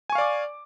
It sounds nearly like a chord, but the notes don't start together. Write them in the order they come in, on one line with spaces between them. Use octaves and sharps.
G#5 C#6 F5 D5 D6